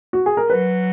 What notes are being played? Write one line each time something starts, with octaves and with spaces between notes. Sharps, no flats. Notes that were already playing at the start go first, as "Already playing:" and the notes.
F#4
G#4
A#4
F#3 B4